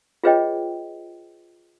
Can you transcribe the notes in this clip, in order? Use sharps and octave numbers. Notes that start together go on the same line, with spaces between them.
F4 G#4 B4 C#5 D#5 G5